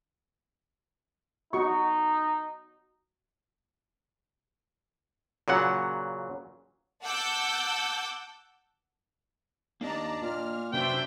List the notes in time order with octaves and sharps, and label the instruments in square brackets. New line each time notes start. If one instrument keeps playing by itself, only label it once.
[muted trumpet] D#4 [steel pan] F#4 C#6
[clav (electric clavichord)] A#2 C#3 F#3 F#5
[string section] F#5 A5 D6 E6 G6
[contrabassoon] D#2 [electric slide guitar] A#3 D4 D#5 [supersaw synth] D5 A5 A#5
[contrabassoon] A#2 [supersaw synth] F6
[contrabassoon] F#2 [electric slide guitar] C3 B4 [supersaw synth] D4 C5 E5 [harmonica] G5